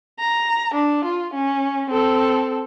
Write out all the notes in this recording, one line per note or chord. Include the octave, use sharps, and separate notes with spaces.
A#5
D4
F4
C#4
C4 A4